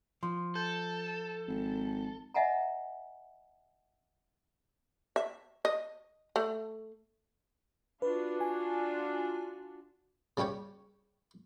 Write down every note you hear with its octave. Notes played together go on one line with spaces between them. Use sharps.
F3 C6
A4 G6
G#1
D#5 E5 F#5 G#5 A#5
E5
D#5
A3
D4 F4 F#4 B4
G#5
C#3 G3 C#4 G4 C#5